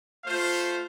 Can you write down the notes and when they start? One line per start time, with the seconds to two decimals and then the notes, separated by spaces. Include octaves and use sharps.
0.25 A3 F4 C5 F5